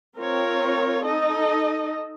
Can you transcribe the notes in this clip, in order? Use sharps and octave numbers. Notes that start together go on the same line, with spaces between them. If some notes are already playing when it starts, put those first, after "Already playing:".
C4 F4 A#4 C#5
D#4 A4 D#5